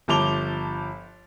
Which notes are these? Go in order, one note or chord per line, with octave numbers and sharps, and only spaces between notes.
G1 F3 A5 D6 F7 G7